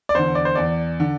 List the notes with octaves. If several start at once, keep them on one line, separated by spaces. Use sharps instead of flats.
D5
E2 D3 C5
D5
C5
E2 D5
D3